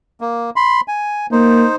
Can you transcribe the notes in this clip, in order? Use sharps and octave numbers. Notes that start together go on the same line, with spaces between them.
A#3
B5 C6
G#5
A#3 D#4 C5